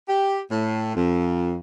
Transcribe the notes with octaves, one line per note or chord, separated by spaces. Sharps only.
G4
A2
F2